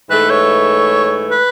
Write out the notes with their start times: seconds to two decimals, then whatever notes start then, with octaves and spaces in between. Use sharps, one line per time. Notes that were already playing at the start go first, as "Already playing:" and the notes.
0.10 G#2 E3 A3 B4
0.30 C#5
1.31 B4